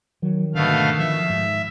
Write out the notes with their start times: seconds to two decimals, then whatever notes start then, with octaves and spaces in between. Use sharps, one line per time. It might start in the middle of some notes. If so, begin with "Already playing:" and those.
0.22 D#3 F#3
0.55 G#2 B2 D3 A3 F5
0.99 F3 E5
1.29 G#2